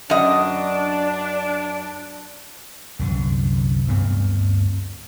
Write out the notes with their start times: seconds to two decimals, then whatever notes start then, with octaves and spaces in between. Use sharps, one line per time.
0.10 F#2 D4 D#5
2.99 C2 F#2 D3
3.87 D2 G2 B3 C4